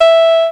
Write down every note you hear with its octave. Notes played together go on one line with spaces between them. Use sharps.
E5